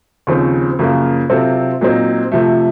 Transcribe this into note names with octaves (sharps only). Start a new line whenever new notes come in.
D#2 C#3 F3 C4
F#2 C#3 F3 A#3 F4
C3 F#3 C4 F4 A4
A#2 F#3 C4 D#4
C3 F3 A3